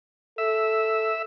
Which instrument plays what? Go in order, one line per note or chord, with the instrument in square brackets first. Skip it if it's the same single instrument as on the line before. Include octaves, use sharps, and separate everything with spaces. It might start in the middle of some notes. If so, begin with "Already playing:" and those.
[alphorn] A4 [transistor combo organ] E5